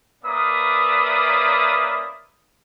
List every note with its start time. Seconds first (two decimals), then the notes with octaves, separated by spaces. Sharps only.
0.24 A#3 C#4 B4 D5 E5 D#6